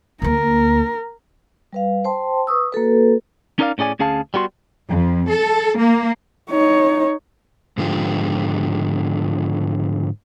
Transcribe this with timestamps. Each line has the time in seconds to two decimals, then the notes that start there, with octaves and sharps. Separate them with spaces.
0.22 D2 A#3 A#4
1.73 G3 B4 F5
2.05 C5 G5 A5 C6
2.47 B4 C#6 D#6 E6
2.73 A#3 F#4 A4 B4
3.59 C#4 D#4 A#4 D5 D#5 F5
3.78 A2 C#4 G#4 D5 G#5
3.99 D2 C#4 G#4 F5 A5
4.34 G3 B3 F#4 C6
4.89 F2
5.29 A4
5.79 A#3
6.50 D#4 C#5
7.78 G#2 D3 F3 F4 G4